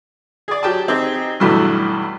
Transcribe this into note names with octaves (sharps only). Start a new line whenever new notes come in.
G#4 D5
F#3 G4 G5 A5
C4 D#4 G4 G#4
B1 E2 G2 B2 E3 A3